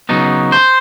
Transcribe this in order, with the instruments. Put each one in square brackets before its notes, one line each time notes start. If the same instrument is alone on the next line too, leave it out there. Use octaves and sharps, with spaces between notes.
[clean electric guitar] C#3 F#3 B3 D#4
C5